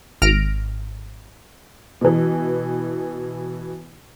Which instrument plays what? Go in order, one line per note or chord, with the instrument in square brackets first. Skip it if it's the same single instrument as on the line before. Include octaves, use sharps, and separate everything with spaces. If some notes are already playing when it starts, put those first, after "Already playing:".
[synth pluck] G#1 F6 A#6 D7
[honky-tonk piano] B2 E3